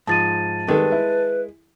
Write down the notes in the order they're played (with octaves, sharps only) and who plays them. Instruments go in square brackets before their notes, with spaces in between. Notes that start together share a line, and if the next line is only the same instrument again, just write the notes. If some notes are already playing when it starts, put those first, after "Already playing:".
[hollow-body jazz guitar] G#2 F3 [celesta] A5 A6 D#7
[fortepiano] D#3 G3 A4 [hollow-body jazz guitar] G#3 [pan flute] B4
[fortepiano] E4